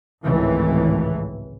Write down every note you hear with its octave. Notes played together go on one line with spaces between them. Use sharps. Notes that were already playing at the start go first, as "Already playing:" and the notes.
G#1 C#2 A2 E3